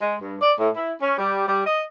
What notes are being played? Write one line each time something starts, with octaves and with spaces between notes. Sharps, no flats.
G#3
G2
D5
A2
E4
C#4
G3
G3
D#5